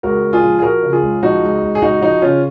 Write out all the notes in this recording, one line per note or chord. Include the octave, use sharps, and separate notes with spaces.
C#2 F#4 A#4
C#2
F4 G#4
F3
G#4
F3 F#4 A#4
C#3
F4 G#4
C#2
F3 D#4 F#4
C#2
C#2
G#4
C#2 D#4 F#4
F3 D#4 F#4
C#3 C#4 F4